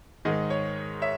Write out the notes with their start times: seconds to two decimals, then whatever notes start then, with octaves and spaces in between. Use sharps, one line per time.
0.25 G#2 D#3 G#3 D#5
0.50 C#5
1.02 C#5 E5